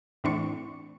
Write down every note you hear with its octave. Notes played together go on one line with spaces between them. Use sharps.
A2 E3 C4 D4 C#6